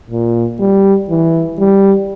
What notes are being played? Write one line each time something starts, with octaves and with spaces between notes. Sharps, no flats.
A#2
G3
E3
G3